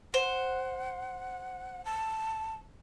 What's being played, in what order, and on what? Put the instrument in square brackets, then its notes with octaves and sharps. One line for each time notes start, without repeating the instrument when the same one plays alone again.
[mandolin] C5 [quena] F#5
[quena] A5